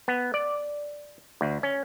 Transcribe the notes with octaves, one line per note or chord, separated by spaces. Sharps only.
B3
D5
D2
C#4